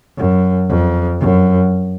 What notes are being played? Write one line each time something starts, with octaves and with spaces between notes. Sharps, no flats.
F#2
F2
F#2